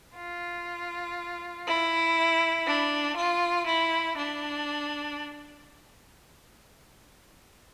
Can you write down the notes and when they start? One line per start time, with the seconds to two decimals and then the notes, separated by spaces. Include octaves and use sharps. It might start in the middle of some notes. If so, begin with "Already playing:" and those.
0.17 F4
1.67 E4
2.66 D4
3.16 F4
3.66 E4
4.16 D4